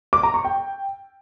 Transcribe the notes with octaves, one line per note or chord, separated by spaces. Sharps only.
D6
A#5
C#6
G5